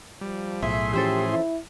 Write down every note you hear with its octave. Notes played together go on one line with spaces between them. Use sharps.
F3 G3
B1 A2 G#4 E5 C6
E3 F3 C#4 G4 A4 C5 E5
E4